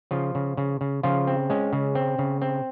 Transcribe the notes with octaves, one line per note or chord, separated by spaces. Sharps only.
C#3 F3 F4
C#3
C#3
C#3
C#3 F3 F4
C4
G#3 C#4
C#3
C4
C#3
C4